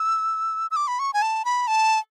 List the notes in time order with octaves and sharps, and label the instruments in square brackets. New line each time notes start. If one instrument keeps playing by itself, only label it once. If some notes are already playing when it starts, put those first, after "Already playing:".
Already playing: [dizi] E6
E6
D6
B5
C#6
G#5
A5
B5
A5